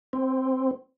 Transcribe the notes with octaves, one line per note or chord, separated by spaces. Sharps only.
C4